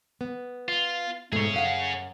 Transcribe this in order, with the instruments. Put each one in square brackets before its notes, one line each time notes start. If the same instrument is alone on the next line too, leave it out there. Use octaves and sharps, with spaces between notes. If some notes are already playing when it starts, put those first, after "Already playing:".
[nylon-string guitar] B3
[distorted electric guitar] F4
[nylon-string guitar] G#2 B2 A3 [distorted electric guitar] G#4 C#5
[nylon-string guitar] F#2 F5 F#5